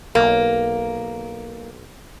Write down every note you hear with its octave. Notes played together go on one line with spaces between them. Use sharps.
B1 A#3